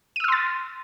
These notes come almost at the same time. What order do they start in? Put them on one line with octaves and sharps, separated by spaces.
D#7 E6 F6 C6 A6